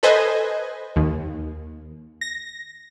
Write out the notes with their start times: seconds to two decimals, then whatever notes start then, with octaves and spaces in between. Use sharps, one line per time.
0.03 A4 B4 C5 D#5 G#5
0.96 D#2
2.21 A#6